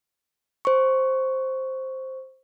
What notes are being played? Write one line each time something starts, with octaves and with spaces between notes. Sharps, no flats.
C5 C#6